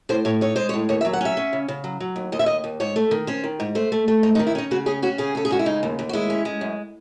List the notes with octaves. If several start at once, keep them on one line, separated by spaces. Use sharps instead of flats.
A2 C5
A2 C#5
D#4 C#5
G#3 C5
C#5
A2
D#2 C#5
E5
F#3
F#5
C#4 E5
C#4
C#3
C#3
F#3
F#3
D#2
D#2 D#5
E5
D#2 D#5
D#2
G#2 C#5
A3
D#3
C#4 C5
D#3
G#2
A3 C5
A3
A3
G#2 D#4
D#4
D#3
E4
C#4 D#4
C#3 F#4
C#4 G#4
C#4 F#4
C#3 G#4
C#4 A4
G#4
G#3 F#4
E4
C#3 D#4
D#2
D#2
F#4
G#3 E4
C#4
G#3
F#2